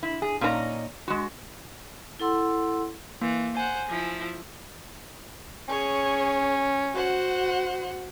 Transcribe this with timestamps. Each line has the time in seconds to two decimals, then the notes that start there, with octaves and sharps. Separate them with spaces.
0.03 E4
0.22 G#4
0.41 A#2 C#4 D#4 B4 A#5
1.08 G#3 F#4
2.20 E4 A4 F#5 C6 E6
3.22 E3 A#3
3.57 C5 F#5 G#5
3.89 F3 E4
5.68 C#4 G#4 C#5
6.92 F#4 C5 F#5